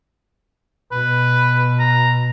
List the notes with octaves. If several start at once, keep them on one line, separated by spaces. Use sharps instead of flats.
B2 B4
A#5